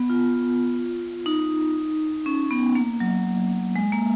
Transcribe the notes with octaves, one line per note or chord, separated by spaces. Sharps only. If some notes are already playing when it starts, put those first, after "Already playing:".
Already playing: B3
F4
D#4
C#4
B3
A#3
F#3
G#3
A#3